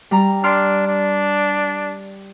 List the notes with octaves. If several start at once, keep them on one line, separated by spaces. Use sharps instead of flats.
G3 A#5
D4 D5 C6 F6
D4